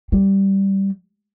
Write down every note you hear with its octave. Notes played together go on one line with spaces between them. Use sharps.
G3